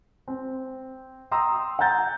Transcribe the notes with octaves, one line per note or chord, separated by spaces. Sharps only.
C4
G5 A#5 C6 D#6 E6
F#5 G#5 A#5 G6 A6